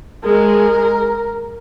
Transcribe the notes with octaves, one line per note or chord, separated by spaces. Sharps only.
G#3 A#4